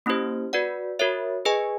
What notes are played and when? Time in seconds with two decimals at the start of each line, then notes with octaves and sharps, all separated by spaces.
0.06 A#3 C#4 E4 G4 C5
0.53 F#4 B4 D5 F#5
0.99 F#4 A#4 C#5 E5
1.45 G#4 B4 D#5 G#5